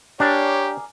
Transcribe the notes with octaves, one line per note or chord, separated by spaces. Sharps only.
D4 G4 G#4 A#4 C#5 D5